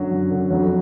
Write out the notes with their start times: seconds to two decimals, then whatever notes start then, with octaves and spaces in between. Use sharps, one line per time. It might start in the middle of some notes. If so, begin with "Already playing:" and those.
Already playing: F#2 D3 F#3
0.11 F#2
0.30 D3
0.50 F2 F#3